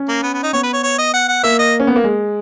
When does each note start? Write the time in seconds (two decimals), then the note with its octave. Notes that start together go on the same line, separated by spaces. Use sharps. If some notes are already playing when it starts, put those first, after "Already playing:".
Already playing: C#4
0.08 A#3
0.23 B3
0.33 B3
0.43 D#4
0.53 B3 C#5
0.63 B4
0.73 C#5
0.83 C#5
0.98 D#5
1.14 F#5
1.28 F#5
1.43 A#3 E5
1.59 D#5
1.80 C#4
1.87 B3
1.96 A#3
2.04 G#3